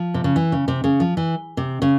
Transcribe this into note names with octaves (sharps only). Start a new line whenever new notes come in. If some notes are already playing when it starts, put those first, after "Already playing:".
Already playing: F3
C3
C#3
E3
C#3
C3
C#3
F3
E3
C3
C#3